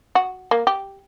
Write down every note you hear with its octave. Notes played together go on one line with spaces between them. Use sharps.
F#4
A#3
G4